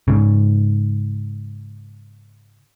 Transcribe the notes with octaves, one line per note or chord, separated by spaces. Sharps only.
G#2 C#3